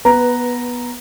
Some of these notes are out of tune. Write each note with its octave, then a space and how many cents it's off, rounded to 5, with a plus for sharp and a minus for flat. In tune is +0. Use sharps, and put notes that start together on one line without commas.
B3 -15 B4 +0 A#5 +0